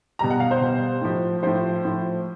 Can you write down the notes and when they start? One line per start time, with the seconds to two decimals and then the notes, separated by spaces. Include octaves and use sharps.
0.19 B2 G3 A#5
0.30 F#5
0.40 F5
0.51 C5
0.61 B2 G3
1.02 A2 F3
1.43 A2 F3 C5
1.85 A2 F3